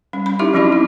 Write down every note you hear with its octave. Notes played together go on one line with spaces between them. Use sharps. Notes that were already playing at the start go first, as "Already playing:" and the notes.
G3 C#4
C#4 B5
D#4 E4 G4 E5 C#6
F3 F#3 C4 C#4 E4 F#4
E4